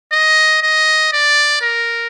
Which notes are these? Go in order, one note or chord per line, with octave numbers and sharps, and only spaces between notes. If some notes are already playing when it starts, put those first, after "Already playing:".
D#5
D#5
D5
A#4